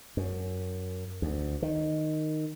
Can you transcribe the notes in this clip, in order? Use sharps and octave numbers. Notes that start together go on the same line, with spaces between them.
F#2
D2
D#3